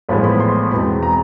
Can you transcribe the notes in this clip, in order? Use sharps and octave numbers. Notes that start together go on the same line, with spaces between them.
A1 A2 F3 G#3 B3 B5
B5
C6
E2 B2 G#3 C4 B5
A#5